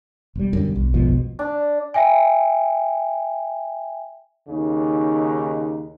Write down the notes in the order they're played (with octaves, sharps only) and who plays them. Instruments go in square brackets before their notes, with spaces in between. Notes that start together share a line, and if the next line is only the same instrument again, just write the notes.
[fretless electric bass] E1 G3
[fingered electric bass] F#2 D3
B1
[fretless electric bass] F1 B1 F3 [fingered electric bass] G#2 B2
[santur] D4
[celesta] E5 G5 G#5
[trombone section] D#2 C#3 D#4